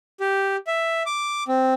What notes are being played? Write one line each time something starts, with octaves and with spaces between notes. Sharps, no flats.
G4
E5
D6
C4